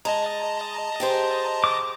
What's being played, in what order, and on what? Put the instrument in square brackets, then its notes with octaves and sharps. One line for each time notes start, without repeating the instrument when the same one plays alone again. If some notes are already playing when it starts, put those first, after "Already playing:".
[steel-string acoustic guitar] G#3 [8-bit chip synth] D#5 A5 A#5
[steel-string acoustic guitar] G4 G#4 C5
[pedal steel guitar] D6